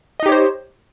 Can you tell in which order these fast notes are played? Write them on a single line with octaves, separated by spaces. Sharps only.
D#5 D#4 G4 C#5 C5